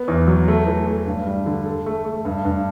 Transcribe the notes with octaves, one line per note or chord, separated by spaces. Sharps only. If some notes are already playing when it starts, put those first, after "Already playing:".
Already playing: B3
E2
F#3
A3
E3
A3
G2
G3
D3
A4
A3
A3
G2
G2